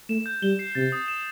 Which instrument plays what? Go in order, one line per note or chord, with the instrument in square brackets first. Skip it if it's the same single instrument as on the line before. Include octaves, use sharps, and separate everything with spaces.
[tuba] A3 [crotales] E7
[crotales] G6
[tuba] G3 [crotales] G7
[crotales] C7
[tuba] C3 [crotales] A6
[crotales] D#6
E7